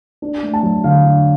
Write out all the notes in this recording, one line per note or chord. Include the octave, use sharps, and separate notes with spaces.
D4
A3
A5
F#3
D3 F5
D4